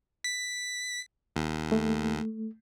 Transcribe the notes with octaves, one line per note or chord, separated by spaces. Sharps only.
B6
D#2
A3